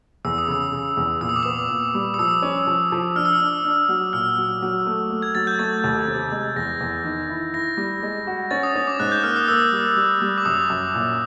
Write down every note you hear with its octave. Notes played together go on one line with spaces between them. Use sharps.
E2 E6
D#6
C#3 E6
C#3
E2
A#2 E6
D#6
D6
B3 D#6
A#2
G3
D#6
F3 E6
C#4
F3
F3
D4 F6
E6
F6
D4
D4
F#3
A#2 F6
F#3
F#3
A3
A3
G#6
F#3 A6
G6
A3 A6
D#2
C3
G#3
E2 A#6
E2
D#3
E4
E4 A#6
G3
G#3
F#4
C#4 A6
D#6
C#4
D6
G#2 F#6
G6
A#3 F6
D#6
A#3 E6
G3
G3
G3
D6
F#2 D#6
F#2
A#2